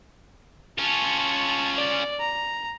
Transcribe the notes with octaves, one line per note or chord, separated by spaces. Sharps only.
C#4 F4 A5 C#6
D5
A#5